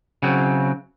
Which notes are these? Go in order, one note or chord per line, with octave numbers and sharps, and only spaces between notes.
C#3 F#3 C4